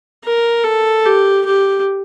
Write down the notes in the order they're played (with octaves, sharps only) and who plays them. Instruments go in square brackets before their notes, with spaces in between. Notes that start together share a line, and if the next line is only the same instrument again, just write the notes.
[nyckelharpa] A#4
A4
G4
G4